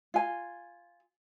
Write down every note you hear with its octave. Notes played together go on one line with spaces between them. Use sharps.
F4 G#5